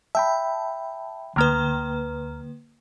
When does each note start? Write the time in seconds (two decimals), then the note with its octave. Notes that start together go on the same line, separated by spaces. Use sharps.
0.15 E5 G5 A5 B5
1.36 D2 D3 A#3 B4 A#5 F6